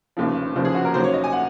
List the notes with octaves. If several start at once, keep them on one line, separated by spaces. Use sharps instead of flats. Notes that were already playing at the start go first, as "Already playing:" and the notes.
F1 D#2 C#3 F3
F1 D#2 C#3 F3 C5
G#4
F#4
A#4
D#2 C#3 F#3 C5
C#5
D#5
G#5
F#5